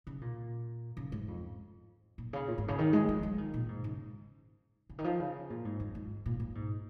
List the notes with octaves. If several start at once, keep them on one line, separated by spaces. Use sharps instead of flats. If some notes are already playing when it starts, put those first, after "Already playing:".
C#3
A#2
C#3
G#2
F2
A#2
C#3
A#2
G#2
C#3
D#3
G#3
F3
F3
D#3
A#2
G#2
C#3
C#3
D#3
F3
C#3
A#2
G#2
F2
G#2
A#2
A#2
G#2